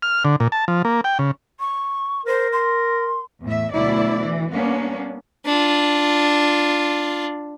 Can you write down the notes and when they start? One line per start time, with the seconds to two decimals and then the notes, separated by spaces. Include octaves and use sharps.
0.02 F6
0.25 D3
0.40 A#2
0.52 A5
0.68 F3
0.85 A#3
1.04 G5
1.19 C#3
1.59 C#6
2.26 A#4 C5
2.52 C6
3.43 E2 A2 E5
3.73 D2 B2 F#3 E4 D5
4.20 E3
4.52 G3 A#3 B3 C#4 D4
5.46 D4 F4